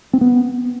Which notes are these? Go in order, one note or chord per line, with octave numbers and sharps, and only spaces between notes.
C4
B3